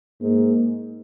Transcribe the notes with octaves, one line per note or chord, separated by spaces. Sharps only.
G#2 A#3